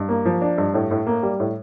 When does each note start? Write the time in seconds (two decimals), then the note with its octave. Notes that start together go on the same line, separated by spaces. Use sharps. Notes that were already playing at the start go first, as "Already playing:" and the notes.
Already playing: G2
0.09 A#3
0.25 F3
0.42 D4
0.58 G2
0.74 A2
0.91 A2
1.07 A#3
1.23 G3
1.40 A2